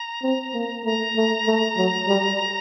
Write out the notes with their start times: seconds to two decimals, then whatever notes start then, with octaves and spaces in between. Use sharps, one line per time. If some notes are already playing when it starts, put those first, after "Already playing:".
Already playing: A#5
0.23 C4
0.54 A#3
0.85 A3 A#5
1.16 A3
1.47 A3
1.77 F#3
2.08 G3